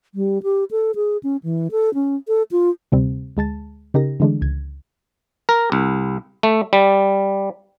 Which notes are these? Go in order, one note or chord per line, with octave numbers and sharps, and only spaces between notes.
G3
G4
A4
G#4
C#4
E3
A4
C#4
A4
F4
D2 C3 G3 C4
D2 G#3 A5 A6
C#3 D#4 G4 A#4 A#6
D3 E3 G#3 A3 D4
C#2 G#6
A#4
C2
A3
G3